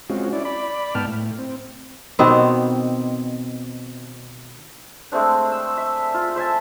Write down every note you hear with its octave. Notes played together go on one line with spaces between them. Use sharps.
G#3 C4 C#4 F4 F#4
C#4 E4 D5
D5 B5
G#2 B3 G5 A5 F6
A2
C4
B2 D#3 B3 C4
G#3 A3 C4 D4
E6
E5
F4
C5 E5 G#5 A5